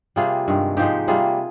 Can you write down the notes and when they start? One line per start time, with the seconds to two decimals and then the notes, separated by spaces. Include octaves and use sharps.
0.16 C3 G3 A#3 F4 G#4
0.48 G2 D#3 G#3
0.77 G#2 F3 G#3 D#4 G4
1.08 C3 G3 A#3 F4 G#4